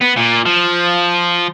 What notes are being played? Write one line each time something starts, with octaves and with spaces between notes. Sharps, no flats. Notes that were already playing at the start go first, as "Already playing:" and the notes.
B3
A#2
F3